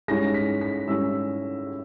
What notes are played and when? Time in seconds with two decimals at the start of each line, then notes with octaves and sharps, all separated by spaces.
0.08 G#2 G3 C#4 E4 A#6
0.34 B6
0.61 B6
0.87 G#2 G3 C#4 E4 E6